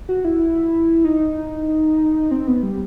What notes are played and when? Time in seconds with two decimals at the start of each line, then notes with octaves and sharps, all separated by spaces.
0.09 F#4
0.25 E4
1.04 D#4
2.31 C4
2.47 B3
2.63 G3